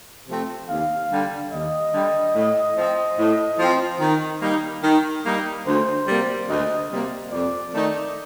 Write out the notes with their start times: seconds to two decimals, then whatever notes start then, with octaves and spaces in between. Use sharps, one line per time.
0.28 C3 F3 A3 C4
0.69 D#2 F5
1.11 D3 G3
1.52 D#2 D#5
1.94 D3 G3
2.35 A2
2.76 F3 C4
3.18 A2
3.59 F3 C4
4.00 D#3
4.42 G3 A#3 D#4
4.84 D#3
5.25 G3 A#3 D#4
5.66 D2 C5
6.07 C3 G3 A#3
6.49 D2 D#5
6.91 C3 G3 A#3
7.32 F2 D5
7.73 D#3 A3 D#4